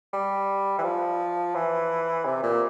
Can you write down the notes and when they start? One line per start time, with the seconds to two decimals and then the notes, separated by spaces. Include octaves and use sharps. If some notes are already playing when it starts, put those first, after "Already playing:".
0.13 G3
0.78 E3
0.83 F3
1.55 E3
2.25 C3
2.43 A#2